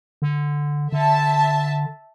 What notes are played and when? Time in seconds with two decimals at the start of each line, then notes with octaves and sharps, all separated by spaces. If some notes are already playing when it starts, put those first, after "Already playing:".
0.22 D3
0.92 D3 E5 A5